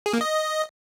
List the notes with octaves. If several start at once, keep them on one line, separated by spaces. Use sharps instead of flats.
G#4
A#3
D#5